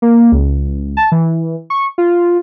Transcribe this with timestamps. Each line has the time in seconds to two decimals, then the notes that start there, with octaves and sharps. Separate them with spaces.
0.02 A#3
0.32 C#2
0.97 A5
1.12 E3
1.70 C#6
1.98 F4